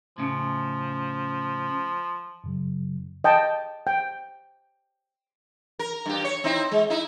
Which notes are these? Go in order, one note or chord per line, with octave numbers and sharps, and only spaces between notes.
A2 C#3 F3
F#2 C#3 F#3
D#5 G5 A5
G5
A#4
G2 G4
C#5
C4 D#4 E4
G#3
D#4 E4